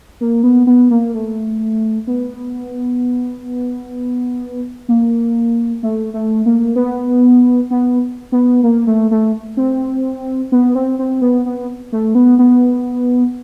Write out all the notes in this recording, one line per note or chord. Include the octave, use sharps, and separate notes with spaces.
A#3
B3
B3
A#3
A3
B3
A#3
A3
A3
A#3
B3
B3
B3
A#3
A3
A3
C4
B3
C4
C4
B3
B3
A3
B3
B3